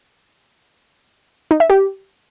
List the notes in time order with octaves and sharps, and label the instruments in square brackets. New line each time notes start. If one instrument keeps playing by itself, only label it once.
[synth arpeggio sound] D#4
E5
G4